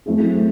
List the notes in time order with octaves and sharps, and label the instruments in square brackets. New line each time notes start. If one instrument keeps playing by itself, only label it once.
[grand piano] F#3 A3 C4 E4 G#4